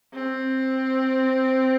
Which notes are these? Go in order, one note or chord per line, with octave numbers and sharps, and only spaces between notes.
C4